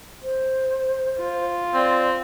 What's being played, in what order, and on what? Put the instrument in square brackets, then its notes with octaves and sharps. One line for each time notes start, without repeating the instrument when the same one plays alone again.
[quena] C5
[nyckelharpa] F4
[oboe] C4 [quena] D5